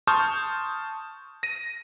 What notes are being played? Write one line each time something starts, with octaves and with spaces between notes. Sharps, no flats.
A5 C6 C#6 D#6 F6 G6
A#6 D#7